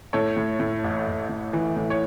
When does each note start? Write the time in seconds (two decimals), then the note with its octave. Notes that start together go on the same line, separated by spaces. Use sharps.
0.13 A2 A4 C#5
0.37 A2
0.60 A2
0.84 A1
1.07 A1
1.29 A2
1.53 E3
1.76 A2
1.90 C#5